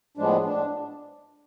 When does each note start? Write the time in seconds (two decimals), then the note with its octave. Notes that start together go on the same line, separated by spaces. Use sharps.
0.17 A2 F3 G#3 B3 D4
0.45 D4